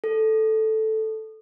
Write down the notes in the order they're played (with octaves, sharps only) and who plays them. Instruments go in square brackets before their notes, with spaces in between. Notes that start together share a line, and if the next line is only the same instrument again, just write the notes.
[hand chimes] A4